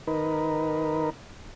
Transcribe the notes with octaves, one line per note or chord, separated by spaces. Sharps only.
D#3 D#4 A#4 B4